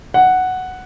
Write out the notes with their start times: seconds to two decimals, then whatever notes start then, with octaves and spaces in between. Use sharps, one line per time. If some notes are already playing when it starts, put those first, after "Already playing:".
0.14 F#5